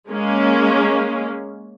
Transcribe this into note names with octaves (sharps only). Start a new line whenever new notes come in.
G#3 A#3 C#4